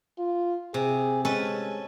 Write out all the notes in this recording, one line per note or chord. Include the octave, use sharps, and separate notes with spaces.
F4
C3 G#4
G#3 C#4 A4 B4